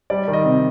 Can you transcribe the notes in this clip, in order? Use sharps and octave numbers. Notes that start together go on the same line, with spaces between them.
G3 D5
D#3
D#5
C3